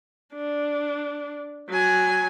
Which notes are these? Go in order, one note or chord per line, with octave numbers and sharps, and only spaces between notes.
D4
F#3 G#5